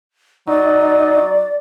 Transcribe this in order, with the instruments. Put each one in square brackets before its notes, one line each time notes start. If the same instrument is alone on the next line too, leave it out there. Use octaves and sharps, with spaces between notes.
[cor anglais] F#3 [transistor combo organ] D#4 [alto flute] D5